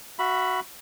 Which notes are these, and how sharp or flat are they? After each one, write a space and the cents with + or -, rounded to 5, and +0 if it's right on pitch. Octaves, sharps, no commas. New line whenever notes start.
F#4 +0 E5 +30 B5 +0